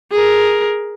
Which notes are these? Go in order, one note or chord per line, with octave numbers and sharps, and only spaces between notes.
G#4 A#4